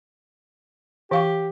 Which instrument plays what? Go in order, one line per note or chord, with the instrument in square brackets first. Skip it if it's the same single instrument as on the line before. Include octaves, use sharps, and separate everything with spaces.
[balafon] E3 F5 C#6 [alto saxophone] G4